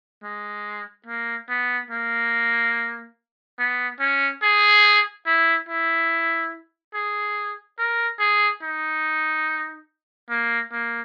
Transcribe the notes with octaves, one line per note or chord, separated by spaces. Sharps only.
G#3
A#3
B3
A#3
B3
C#4
G#4
E4
E4
G#4
A#4
G#4
D#4
A#3
A#3